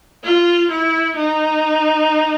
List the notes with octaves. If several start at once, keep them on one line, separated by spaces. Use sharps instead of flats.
F4
E4
D#4